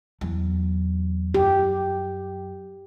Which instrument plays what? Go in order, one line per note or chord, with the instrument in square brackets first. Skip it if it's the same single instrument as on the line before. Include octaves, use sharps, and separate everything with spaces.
[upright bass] E2 F#3
[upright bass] F#2 [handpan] G4